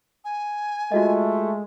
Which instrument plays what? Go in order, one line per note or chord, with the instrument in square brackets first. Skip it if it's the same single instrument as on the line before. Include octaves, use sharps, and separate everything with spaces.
[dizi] G#5
[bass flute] G#3 [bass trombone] A3 [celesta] F4 F#4 D#5